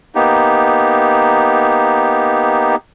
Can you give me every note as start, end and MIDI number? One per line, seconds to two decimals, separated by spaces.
0.15 2.76 58
0.15 2.76 59
0.15 2.76 63
0.15 2.76 67